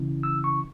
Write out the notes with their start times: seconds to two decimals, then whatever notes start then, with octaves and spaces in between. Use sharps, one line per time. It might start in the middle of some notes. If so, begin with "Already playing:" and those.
Already playing: C#3 E3 C#4 E4
0.23 E6
0.44 C#6